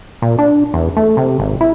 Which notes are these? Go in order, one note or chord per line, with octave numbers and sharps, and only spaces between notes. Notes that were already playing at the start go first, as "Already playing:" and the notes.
A#2
D4
E2
A3
C3
G#1
E4